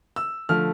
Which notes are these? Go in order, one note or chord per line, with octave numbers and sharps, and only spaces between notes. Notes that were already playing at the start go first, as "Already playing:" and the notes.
E6
D3 F3 A3 F6